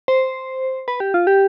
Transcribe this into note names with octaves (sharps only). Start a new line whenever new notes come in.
C5
B4
G4
F4
G4